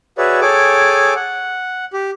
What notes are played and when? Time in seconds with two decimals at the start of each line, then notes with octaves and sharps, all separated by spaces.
0.18 F#4 G#4 B4 C#5 D5 E5
0.41 G#4 A4 C#5 G5 G#5 D6
1.16 F#5
1.93 G4